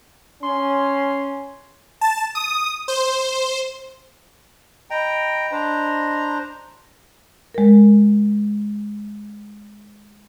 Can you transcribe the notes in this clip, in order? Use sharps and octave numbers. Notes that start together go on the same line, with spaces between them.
C#4 C6
A5
D#6
C5
D#5 G5 A#5 B5
D4 C5 A#5
G#3 A#4